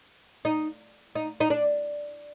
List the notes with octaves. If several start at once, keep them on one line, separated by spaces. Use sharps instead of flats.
D#4
D#4
D#4
D4